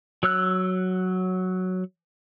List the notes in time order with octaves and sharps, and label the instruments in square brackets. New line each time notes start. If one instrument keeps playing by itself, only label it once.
[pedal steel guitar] F#3 C#5 E6 F#6